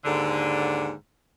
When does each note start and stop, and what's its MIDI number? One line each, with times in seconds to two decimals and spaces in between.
0.05 0.92 39
0.05 0.92 44
0.05 0.92 50